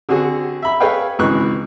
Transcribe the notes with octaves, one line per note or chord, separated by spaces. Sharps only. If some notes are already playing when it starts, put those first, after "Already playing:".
D3 C4 F#4 G#4
E5 B5
G#4 A4 B4 C#5 F5 G5
G#1 C#2 E3 B4 C#6 F#6